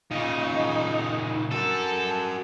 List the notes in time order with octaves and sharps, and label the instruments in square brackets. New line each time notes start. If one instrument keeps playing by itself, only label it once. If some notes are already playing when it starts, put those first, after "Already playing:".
[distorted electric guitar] A#2 C#3 [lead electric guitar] D#4
[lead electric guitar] F#4 A#4 [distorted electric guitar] A4